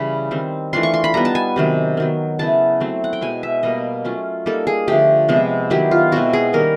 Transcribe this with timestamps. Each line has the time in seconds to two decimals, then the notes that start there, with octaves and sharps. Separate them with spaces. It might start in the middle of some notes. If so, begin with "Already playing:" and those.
Already playing: C#3 E3 G3 B5
0.31 D#3 G3 C4
0.73 E3 A3 D4 F4 C6
0.83 C#6
0.94 C6
1.04 B5
1.14 G3 B3 D#4 A#5
1.25 A5
1.35 G#5
1.56 C3 D#3 F#3
1.97 D#3 F#3 B3
2.39 C#3 F#3 B3 E4 A5
2.80 F#3 A3 C4
3.04 F#5
3.13 G5
3.21 B2 G#3 B3 G#5
3.43 E5
3.63 B2 G3 A#3 D#5
4.05 F#3 A3 C#4 F4
4.46 G3 A#3 D#4 A4
4.67 G#4
4.88 D3 F3 A3 G4
5.29 C3 F3 G#3 B3
5.70 D#3 F#3 B3 E4 G4
5.91 F4
6.12 B2 G#3 C4 E4 F#4
6.33 G#4
6.53 D#3 G3 A#3 C#4 A#4